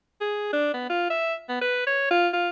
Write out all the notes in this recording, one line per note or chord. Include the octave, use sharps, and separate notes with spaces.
G#4
D4
B3
F4
E5
B3
B4
C#5
F4
F4